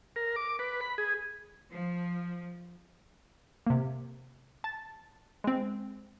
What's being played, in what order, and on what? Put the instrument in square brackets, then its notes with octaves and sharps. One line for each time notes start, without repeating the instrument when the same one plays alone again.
[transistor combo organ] A#4
D6
B4
B5
G#4
[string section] F3
[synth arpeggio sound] C3 A#3
A5 A6
G#3 C4